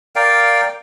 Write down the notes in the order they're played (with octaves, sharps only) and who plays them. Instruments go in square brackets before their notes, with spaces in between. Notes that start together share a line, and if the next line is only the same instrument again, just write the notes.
[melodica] A#4 D5 F5 G5